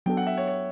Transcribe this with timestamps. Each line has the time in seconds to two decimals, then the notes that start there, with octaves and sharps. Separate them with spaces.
0.06 F#3 B3 D4 A4 G5
0.17 F#5
0.27 E5
0.37 C#5
0.48 C#5